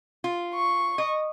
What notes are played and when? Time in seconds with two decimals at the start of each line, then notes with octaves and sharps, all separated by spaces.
0.24 F4
0.55 C#6
0.98 D#5